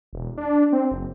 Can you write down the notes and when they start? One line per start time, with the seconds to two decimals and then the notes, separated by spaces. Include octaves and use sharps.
0.13 E1
0.37 D4
0.73 C4
0.91 F#1